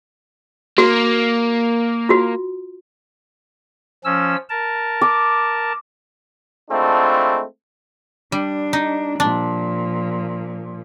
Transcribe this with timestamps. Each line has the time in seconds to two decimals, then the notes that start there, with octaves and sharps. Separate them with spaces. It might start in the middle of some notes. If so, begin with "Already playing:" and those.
0.78 A#3 F#4
2.09 F4 F#4
4.05 F3 C#4 E6
4.49 A#4 A5
5.01 D6
6.70 G#3 A3 C4 D4 E4 F4
8.32 G3 D4
8.73 D#4
9.20 A#2 F3 D4